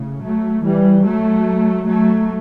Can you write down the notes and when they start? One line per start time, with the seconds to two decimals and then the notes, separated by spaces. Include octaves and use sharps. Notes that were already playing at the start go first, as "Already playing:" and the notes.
Already playing: A2 C#3
0.22 F#3 A3
0.63 E3 G3
1.04 F#3 A3
1.87 F#3 A3